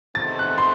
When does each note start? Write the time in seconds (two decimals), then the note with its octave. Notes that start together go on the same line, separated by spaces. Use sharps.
0.15 E2 C3 D#3 A3 C4 A6
0.39 F#6
0.58 C6